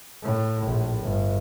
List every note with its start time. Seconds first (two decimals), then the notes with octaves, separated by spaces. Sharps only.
0.23 A2
0.66 A#1 A2
1.01 G1